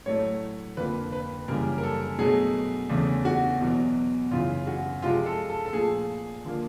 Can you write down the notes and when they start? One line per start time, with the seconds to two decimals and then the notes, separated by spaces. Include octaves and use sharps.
0.06 A2 F#3 A3 C#5
0.77 F2 D3 F3 A#3 B4
1.13 B4
1.48 F#2 C#3 E3 G3 A#3 A#4
1.78 A#4
1.83 A4
2.19 B2 F#3 A3 G#4
2.90 E2 C#3 E3 A3
3.25 F#4
3.61 E2 B2 F#3
4.31 F#2 C#3 E3 F4
4.67 F#4
5.02 C3 F3 G#3 F4
5.26 A4
5.50 A4
5.66 A4
5.73 A#2 F3 A3 G#4
6.45 D3 F3 A#3